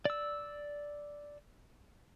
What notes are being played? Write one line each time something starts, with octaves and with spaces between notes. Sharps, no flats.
D5 E6